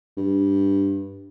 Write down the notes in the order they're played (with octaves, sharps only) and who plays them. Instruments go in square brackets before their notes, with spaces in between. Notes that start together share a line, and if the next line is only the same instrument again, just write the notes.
[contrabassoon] G2